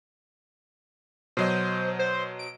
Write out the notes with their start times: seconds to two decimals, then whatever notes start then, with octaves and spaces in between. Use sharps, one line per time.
1.37 B2 F#3 C5 D#5
1.99 C5
2.39 D7